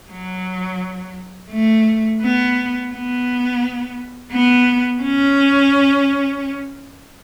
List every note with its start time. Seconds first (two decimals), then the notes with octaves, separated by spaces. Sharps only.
0.11 F#3
1.51 A3
2.21 B3
2.92 B3
4.32 B3
5.03 C#4